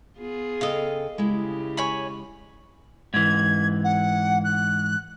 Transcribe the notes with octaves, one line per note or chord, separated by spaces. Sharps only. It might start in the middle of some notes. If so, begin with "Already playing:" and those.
B3 F4 G#4
C#3 A4 D#5 F5 G5
C#3 G#3 E4 G4
C#5 G#5 B5
G#2 E3 G#6
F#5
F#6